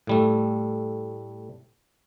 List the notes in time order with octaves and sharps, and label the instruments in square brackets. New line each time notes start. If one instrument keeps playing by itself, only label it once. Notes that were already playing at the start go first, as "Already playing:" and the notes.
[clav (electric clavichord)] A2 G3 A3